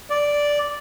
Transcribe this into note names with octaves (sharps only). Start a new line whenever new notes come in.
D5